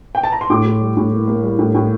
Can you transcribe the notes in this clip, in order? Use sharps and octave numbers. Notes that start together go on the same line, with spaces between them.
G5
A5
A#5
C6
A2 D6
A2
G3
A2
A#3
A#3
G3
A2
A2